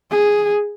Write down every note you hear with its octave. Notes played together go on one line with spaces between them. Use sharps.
G#4